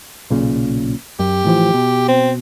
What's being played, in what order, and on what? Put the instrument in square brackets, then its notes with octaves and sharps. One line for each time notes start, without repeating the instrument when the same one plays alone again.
[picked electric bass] B1 A#2 C#3
[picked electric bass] F#2 [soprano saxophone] G4
[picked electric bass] A2 E3 F3
B2
[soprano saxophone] C4